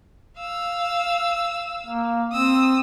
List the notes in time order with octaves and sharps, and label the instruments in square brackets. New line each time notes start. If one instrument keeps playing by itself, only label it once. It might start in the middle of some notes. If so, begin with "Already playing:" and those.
[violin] F5 E6
[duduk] A#3
[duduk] C4 [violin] D#6 E6